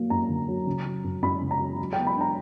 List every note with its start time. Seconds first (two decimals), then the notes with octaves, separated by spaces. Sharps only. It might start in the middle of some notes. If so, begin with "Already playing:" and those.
Already playing: F#3 A#3
0.10 F#2 A#5
0.29 D3
0.48 F#3
0.67 C#3
0.85 F#3
1.04 F#2
1.22 F#2 B5
1.41 C#3
1.51 A#5
1.60 F#3
1.79 F#3
1.93 B3 G5
2.07 B5
2.16 D4 A#5